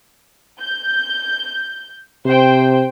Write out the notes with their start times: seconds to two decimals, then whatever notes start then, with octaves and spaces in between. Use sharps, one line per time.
0.60 G6
2.26 C3 C5 G5